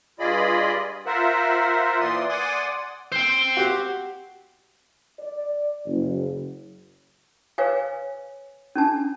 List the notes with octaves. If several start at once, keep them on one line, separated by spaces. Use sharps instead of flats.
G2 F4 G#4 D5 D#5 B5
F4 A#4 C5 E5 F#5
A#2 E3 D5 C6 D#6
D5 F#5 G#5 C6 D6 D#6
C5 G5
F#4 G4
D5
F#1
B4 C#5 F5 G#5
C#4 D4 A5